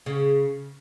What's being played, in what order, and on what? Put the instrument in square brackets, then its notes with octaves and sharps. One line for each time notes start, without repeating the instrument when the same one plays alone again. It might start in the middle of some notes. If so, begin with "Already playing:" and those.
[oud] C#3